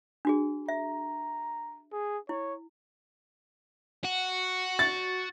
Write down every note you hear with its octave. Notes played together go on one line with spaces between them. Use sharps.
D4 F#4 G#4
E5 A#5
G#4
E4 C#5
F#4
A6